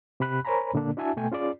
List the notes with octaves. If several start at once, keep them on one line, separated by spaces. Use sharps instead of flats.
C3 G4 B5 F#6
A#4 C5 C#5 G#5 A#5 B5
A#2 D3 A#3 D4
D4 E4 F#4 E5 G#5 A5
B2 A3 G5 G#5
C#4 F4 G#4 D5